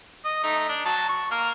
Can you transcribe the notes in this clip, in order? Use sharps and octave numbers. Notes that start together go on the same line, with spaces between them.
D#5
A3 D#4
D4
F#3 A5
C#6
A#3 F6